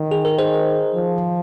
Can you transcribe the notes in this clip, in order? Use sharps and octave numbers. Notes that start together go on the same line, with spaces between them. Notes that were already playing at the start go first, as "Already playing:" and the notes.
Already playing: D#3
G#4
A#4
G#4 C5
F3